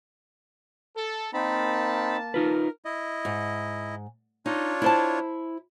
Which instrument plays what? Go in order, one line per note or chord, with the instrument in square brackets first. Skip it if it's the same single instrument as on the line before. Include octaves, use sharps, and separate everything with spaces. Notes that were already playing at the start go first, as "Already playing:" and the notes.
[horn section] A4
[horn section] A#3 A5 [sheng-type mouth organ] C4 D#4 B5
[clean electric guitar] D#4 F4 B4 [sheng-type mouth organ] A#4
[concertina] E4 D#5
[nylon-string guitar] G#2
[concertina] D4 F4 C#5 [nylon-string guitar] D#4
[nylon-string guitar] E4 C5 A5